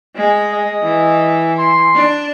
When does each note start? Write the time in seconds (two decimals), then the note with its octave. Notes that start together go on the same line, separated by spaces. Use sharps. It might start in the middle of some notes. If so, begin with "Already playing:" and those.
0.16 G#3
0.53 D#5
0.83 E3
1.58 C6
1.95 D4